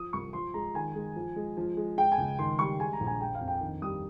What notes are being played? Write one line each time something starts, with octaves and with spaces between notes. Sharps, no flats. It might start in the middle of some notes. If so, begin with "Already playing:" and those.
Already playing: F3 D#6
C2 C#6
F3 C6
G#3 A#5
D#3 G#5
G#3
F3
G#3
F3
G#3
G#3 G5
G#5
C#2
D#3 C6
G3 C#6
G#3 G#5
A#5
A#1
G#5
G#3 G5
F5
F2
G5
D#3
G3 D#6